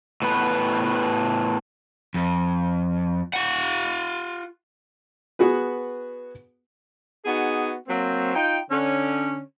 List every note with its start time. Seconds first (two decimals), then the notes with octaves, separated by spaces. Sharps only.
0.22 A2 B3 B4
2.14 F2
3.33 F4 F#5
5.39 B3 F#4 G#4 B4
7.25 B3 D#4 F#4 G#4
7.88 F#3 A#3 C4
8.35 D#4 F4 G5
8.70 D3 C#4